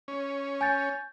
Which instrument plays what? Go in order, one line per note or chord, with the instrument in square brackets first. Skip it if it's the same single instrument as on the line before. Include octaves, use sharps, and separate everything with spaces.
[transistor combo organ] C#4
[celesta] G#5 G6 A6